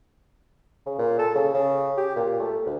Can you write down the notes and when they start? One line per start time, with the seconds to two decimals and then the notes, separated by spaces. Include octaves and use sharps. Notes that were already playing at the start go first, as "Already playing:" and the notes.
0.86 C#3
0.98 A#2
1.19 A4
1.35 C#3
1.54 C#3
1.97 G4
2.16 A#2
2.40 A3
2.66 D2